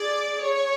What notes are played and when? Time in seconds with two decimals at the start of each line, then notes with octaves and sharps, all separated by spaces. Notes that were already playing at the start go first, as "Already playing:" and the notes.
Already playing: G#4 D5
0.43 G#4 C#5